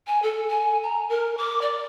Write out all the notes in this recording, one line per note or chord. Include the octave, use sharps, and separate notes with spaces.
G#5
A4
G#5
A#5
A#4
D6
D5